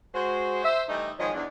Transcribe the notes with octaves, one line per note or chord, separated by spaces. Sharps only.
G#3 F#4 C5
C5 E5
E3 G3 A3 D#4
G#2 D#3 F3 G#3 C#5 D#5
E2 D4